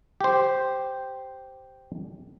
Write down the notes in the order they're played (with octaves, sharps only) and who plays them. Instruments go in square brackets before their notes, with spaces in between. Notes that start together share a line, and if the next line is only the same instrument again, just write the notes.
[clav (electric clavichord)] G4 C5